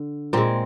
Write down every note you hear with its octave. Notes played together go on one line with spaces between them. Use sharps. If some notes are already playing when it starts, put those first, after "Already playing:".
Already playing: D3
A#2 G#3 C4